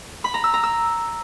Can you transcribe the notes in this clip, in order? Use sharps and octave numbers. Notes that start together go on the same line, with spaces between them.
B5
A#5
E6
A#5
E6